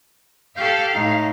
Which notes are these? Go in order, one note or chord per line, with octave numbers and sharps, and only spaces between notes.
G4 A4 F5 G6
A2 D#4